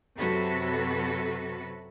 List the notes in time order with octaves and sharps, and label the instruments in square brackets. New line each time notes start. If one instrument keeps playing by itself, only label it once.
[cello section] F#2 C3 F#3 F#4 A4 B4